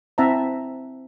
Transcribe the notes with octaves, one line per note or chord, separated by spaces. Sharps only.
C4 E4 E5 F#5 A5 A#5